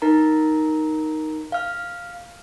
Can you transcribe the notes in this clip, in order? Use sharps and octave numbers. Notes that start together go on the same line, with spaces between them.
D#4 A#4 A#5
F5 F6